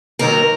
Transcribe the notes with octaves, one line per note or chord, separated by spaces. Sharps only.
D#2 D#3 F#3 A#3 A#4